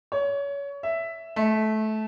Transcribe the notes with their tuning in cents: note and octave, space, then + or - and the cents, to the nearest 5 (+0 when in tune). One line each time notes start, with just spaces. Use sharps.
C#5 +25
E5 +5
A3 -20